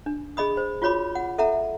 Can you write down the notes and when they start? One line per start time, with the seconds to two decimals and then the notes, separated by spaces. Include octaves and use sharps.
0.06 D4
0.37 G#4 D#5 B5 D#6
0.57 C5
0.82 F4 F#4 C#5 B5 D6
1.15 F#5
1.38 A4 E5 F#5 A#5